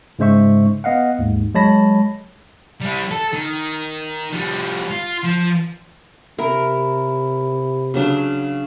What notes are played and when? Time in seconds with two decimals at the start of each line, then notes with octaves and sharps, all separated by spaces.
0.19 G#2 C#3 G#3 C5 E5 C#6
0.84 B3 D#5 F5 F#5
1.19 D#2 G#2
1.55 F#3 G#3 C#5 A5 B5 A#6
2.81 G3 E4
3.11 A4
3.33 D#3
4.33 F3 G3
4.90 F4
5.23 F3
6.38 C3 E4 A#4
7.94 C#3 F#3 D4